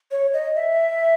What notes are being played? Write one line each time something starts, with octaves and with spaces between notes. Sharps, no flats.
C#5
D#5
E5